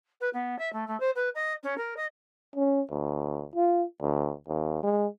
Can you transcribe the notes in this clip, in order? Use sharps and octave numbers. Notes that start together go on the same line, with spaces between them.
B4
B3
E5
A3
A3
C5
B4
D#5
C#4
A#4
D#5
C#4
D2
F4
D2
D#2
G#3